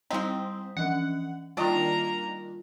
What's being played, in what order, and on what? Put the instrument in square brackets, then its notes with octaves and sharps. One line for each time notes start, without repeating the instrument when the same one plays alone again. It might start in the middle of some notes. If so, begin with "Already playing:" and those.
[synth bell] G3 G6 B6 [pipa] G#3 D#4 [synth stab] C4
[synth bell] E3 F3 C#4 [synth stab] F#5
[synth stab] D#3 D4 [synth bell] G3 F4 [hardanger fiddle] A#3 A#5 [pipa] D5 D#5